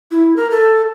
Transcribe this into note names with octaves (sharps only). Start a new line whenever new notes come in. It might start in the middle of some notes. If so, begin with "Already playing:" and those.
E4
A#4
A4